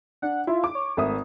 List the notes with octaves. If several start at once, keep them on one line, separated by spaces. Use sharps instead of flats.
D4 F#5
E4 F4
D6
C#5
G#1 A3 E5 D#6